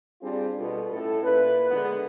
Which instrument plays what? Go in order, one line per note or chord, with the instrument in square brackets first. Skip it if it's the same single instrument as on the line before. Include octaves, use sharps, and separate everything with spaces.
[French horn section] G3 C4 D4 F4 G#4
B2 G3 B3 F4 A4
A2 C#4 A4
A#2 E4 B4
D3 G#3 B3